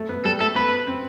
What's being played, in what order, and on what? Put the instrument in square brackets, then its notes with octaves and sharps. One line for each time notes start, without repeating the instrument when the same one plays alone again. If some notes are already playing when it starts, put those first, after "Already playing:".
Already playing: [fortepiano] A3
B3
[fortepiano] G3 [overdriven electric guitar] A4
[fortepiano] A3 [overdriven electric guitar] A4
[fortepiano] B3 [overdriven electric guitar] B4
[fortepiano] C4